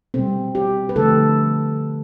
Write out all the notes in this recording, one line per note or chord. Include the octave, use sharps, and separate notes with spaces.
B2 G3 C4
G4
B4
D3 F3 A3 A4